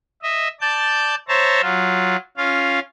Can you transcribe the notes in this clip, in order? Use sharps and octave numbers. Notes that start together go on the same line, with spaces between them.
D#5 E5
D5 A5 G6
C5 C#5 E5 A5 A#5
F#3 F4
C#4 F4 F5